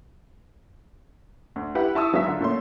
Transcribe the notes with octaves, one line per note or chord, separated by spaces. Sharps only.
D2
E4 G4 B4 F#5
E4 A5 C#6 D#6 E6
G#1 F#3 B3 G#4 E5 B6
D3 F4
A#2 A3 C#4 C6